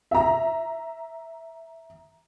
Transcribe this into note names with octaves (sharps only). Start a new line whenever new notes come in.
E5 A#5